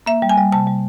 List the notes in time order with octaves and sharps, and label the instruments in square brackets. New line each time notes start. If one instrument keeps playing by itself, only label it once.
[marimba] A#3 E5
G3
G#5
G3
C3 A5
G3